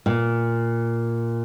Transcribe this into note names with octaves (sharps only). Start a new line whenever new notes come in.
A#2